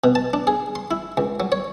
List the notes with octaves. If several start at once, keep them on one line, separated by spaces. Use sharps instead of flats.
B2
A5
D4
G#4
C6
E4
C#2
F#3
C#5